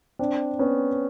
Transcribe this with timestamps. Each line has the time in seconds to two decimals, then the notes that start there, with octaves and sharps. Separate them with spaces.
0.19 C4 D4
0.59 B3 C#4